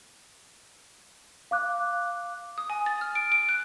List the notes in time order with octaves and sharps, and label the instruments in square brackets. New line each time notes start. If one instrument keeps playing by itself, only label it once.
[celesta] F5 D6 F#6
[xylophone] D#6
G#5
A6
F6
D7
D7
F#6